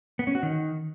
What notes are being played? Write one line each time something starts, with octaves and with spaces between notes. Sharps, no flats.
B3
C#4
F#4
D#3